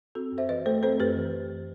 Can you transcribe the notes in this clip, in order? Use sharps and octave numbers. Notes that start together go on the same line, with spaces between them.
C4 F#4 A4
F#2
C5 E5
E3 B4 D#5
A3 A4 C5
C4 A4 C5
F#2 G4 B4
E3